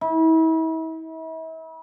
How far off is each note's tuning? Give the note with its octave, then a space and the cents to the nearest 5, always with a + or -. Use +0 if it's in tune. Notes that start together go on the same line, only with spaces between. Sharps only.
E4 -40